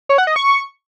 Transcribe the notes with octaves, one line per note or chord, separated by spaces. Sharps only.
C#5
F#5
D#5
C#6